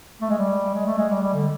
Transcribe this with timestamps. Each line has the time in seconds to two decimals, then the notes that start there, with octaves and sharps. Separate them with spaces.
0.22 A3
0.30 G#3
0.38 G3
0.74 G#3
0.86 A3
0.98 G#3
1.10 G3
1.22 G3
1.34 D3